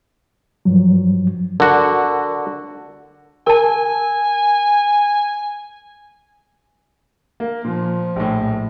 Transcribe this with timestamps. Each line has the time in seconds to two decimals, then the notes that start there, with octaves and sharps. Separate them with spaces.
0.65 G2 F3 F#3
1.60 D3 F#4 A#4
3.47 A#4 G#5 A5
7.40 A#3
7.64 A#2 F3
8.16 A#1 A2